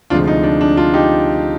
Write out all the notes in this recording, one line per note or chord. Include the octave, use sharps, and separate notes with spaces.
D2 C3 F3 G#3 D4 F4
D#4
D4
D4
D4 F4
D#4 G4